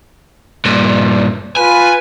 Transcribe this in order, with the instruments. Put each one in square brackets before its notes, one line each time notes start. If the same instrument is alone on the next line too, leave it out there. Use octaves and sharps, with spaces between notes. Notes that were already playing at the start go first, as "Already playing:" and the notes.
[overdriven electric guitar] G2 A#2
[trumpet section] F4 B4 [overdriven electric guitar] G#5